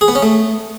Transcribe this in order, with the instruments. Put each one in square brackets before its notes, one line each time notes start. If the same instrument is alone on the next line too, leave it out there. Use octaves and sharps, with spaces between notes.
[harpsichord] G#4
B3
C#4
A3